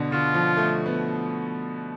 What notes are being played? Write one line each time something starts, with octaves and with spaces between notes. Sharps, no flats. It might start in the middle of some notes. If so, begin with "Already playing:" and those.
Already playing: B2 D3
D3 F4
F3
A3
B3